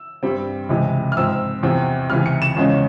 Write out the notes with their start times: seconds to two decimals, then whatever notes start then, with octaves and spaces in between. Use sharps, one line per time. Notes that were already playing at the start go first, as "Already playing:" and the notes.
Already playing: E6
0.23 G2 G3 C4
0.69 C#2 C3 E3 G#3
1.12 F6
1.17 G#2 F3 C4 E6
1.63 E2 C3 F3 C4
2.10 C#2 C3 E3 F6
2.26 C#7
2.42 E7
2.57 E2 C#3 F3 G#3 C#4